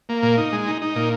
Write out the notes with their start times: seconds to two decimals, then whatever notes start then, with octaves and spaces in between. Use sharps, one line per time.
0.09 A#3
0.23 A#2
0.38 D#4
0.52 G#3
0.67 D#4
0.82 D#4
0.95 A#2